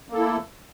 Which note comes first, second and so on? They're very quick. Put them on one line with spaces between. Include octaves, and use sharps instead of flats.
A#3 A4 E4 A3